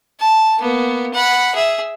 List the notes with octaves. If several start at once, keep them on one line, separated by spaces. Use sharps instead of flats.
A5
A#3 B3
F#5 B5
G#4 E5